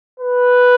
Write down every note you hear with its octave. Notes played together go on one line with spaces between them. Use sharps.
B4